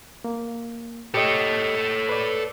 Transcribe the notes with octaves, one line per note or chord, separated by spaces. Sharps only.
A#3
G4 A4 C#5 D#5
B4 D5